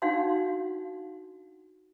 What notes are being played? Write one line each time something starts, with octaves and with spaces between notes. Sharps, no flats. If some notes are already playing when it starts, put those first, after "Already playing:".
D4 D#4 F#4 F5 F#5 C6